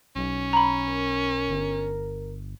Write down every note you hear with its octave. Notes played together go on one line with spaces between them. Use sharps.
B1 C#4
A#5 B5
A#4
G1